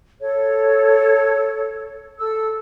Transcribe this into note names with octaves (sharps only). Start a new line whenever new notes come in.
A4 C#5
A4 E6